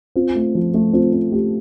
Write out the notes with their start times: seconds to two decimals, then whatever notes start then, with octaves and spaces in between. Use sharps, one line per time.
0.16 C4 F4
0.35 A3
0.55 F3
0.74 A3
0.93 C4 F4
1.13 C4
1.32 A3 G4